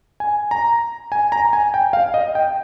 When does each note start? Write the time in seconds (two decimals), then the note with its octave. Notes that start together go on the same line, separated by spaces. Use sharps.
0.20 G#5
0.51 A#5
1.12 G#5
1.32 A#5
1.53 G#5
1.74 G5
1.93 F5
2.14 D#5
2.35 G5